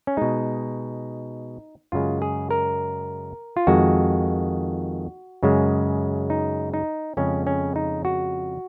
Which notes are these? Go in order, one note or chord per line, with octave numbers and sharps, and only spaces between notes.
C#4
B2 G#3 D#4
F#2 C#3 G#3 F4
G#4
A#4
F4
F2 D#3 G#3 F#4
F#2 C#3 G#3
D#4
D#4
F2 C#3 G#3 C#4
C#4
D#4
F#4